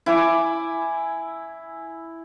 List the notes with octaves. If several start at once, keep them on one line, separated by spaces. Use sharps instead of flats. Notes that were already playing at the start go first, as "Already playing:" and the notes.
E4 G#5 D6